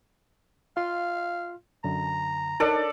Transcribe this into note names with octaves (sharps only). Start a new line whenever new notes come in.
F4 F5 C6
F#2 D3 A#5
D4 D#4 A4 A#4 C#5 D5